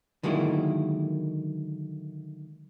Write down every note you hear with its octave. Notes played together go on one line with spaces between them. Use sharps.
D3 D#3 F#3 G#3 A#3 E4